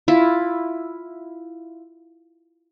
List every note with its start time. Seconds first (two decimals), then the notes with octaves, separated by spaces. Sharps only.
0.08 E4 F4